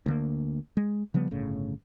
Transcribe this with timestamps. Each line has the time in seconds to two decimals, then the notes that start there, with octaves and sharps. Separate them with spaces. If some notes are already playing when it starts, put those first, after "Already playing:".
0.06 D2 D3 A#3
0.77 G#3
1.14 C#3 F3 G3 B3
1.31 G1 A2 C#3